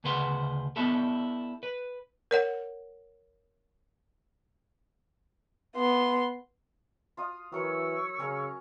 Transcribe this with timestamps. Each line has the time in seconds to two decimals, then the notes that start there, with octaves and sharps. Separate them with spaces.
0.04 D2 C#3 G#4 B4 C5 F#5
0.76 B3 D4 E4 G4 A4
1.63 B4
2.31 A#4 C#5 F#5
5.76 B3 C6
7.17 F4 D#6
7.52 E3 F#3 A#4 C#5 C#6 E6
8.20 C#3 C#4 A#4